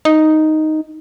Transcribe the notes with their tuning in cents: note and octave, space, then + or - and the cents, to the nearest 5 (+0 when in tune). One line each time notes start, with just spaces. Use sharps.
D#4 +0